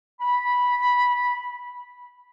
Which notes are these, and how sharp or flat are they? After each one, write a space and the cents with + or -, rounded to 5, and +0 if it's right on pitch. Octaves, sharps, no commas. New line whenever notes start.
B5 -10